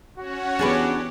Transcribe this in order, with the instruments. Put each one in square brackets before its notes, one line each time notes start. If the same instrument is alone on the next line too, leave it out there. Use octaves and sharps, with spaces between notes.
[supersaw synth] C#4 C#5 F#5 [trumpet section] F#4
[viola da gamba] E2 G4 [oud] D4 G#4 B4